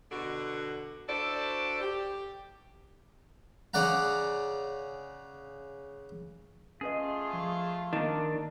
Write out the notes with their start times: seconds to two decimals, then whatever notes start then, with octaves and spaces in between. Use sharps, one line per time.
0.11 B2 D3 F#4
1.09 D4 E4 F#4 A4 C5 D5
1.81 G4
3.74 C#3 D5 F#5 A#5
6.81 A3 C#4 F4 G#4 B4 D#5 C6
7.33 F3 C#6
7.93 D#3 A#3 D4 D#5 A#5